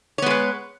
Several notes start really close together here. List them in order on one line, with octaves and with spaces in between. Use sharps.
C#5 B3 G#3 B4